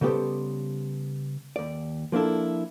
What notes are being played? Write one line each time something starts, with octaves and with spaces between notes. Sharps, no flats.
C#3 G3 B3 G4 A4 C5
D#2 D5
F3 A#3 D4 E4 A4